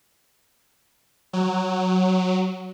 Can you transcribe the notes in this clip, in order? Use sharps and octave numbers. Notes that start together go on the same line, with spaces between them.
F#3